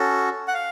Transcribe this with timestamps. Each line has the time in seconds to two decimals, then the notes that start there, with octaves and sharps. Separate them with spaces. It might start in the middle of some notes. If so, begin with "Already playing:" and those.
Already playing: C#4 F#4 A4
0.48 F#5
0.54 F5